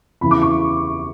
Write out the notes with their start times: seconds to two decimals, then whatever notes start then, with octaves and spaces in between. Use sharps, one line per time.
0.21 E2 C#3 E3 B5
0.31 D6
0.42 C#6